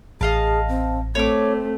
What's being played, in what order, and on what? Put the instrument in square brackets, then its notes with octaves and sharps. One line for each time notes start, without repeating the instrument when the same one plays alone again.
[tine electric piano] A1 [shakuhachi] G#4 [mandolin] D#5 F5 A5
[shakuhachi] C4
[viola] A3 [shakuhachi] C4 [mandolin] C#5 D6